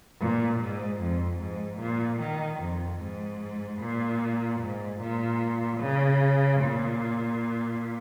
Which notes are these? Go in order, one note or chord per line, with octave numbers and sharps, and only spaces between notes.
A#2
G#2
F2
G#2
A#2
D#3
F2
G#2
A#2
G#2
A#2
C#3
A#2